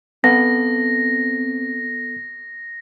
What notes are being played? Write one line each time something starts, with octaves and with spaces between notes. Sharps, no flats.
B3 C4 A4 A#6